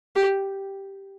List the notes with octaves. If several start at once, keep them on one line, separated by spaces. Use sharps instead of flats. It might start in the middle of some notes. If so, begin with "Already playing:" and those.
G4